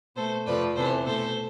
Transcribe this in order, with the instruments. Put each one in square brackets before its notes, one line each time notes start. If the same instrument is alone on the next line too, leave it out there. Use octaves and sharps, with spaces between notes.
[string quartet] B2 A3 A4 C5
F2 C3 F3 A3 B4 D5
E2 C3 E3 A4 C5
B2 A3 A4 C5